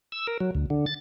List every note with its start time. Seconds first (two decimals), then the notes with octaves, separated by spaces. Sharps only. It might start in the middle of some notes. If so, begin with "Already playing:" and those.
0.12 E6
0.27 A#4
0.40 F#3
0.55 D2
0.70 D3
0.86 A6